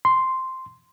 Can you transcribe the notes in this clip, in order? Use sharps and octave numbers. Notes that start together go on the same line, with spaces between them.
C6